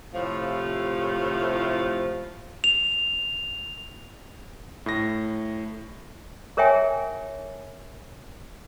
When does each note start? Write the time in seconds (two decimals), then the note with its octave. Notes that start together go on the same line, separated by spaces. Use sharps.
0.13 A2 C3 F3
2.64 F7
4.86 A2 A#6
6.57 G#4 A#4 C#5 E5 G5 G#5